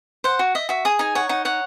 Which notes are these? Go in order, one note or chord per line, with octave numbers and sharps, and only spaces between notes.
C5 F#5
F#4
D#5 E5
F#4 E5
G#4 D#6
D#4 G#5
C#5 F#5
D#4 F#5
C#5 F#5